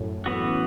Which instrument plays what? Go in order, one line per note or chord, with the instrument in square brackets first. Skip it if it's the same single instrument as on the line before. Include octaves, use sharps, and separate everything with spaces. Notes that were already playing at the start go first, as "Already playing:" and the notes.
Already playing: [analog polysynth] F#2 A2
[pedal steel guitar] E3 B3 F#4